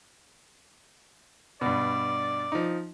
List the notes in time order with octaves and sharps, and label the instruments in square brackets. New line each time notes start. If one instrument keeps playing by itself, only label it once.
[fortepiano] G2 B2 [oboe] D5
[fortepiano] F3 D#4